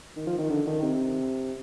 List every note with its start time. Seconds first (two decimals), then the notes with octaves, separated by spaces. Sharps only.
0.16 D#3
0.27 F3
0.38 D#3
0.50 D3
0.67 D#3
0.82 C3